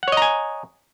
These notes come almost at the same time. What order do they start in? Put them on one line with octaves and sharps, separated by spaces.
F#5 C#5 D#5 A#5 G#5